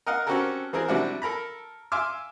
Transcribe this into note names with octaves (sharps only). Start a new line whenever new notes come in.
A#4 D#5 F5 F#5
C4 C#4 F#4 G4 A4 A#4
E3 C4 G#4 A#4
C3 F3 G3 D4 E4 F#4
A4 A#4 A#5 B5
E5 F5 G#5 C6 D6 F6